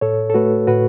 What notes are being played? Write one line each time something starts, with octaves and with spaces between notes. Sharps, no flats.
A2 A4 C#5
A4
A3 F#4 B4
A2 F#4 B4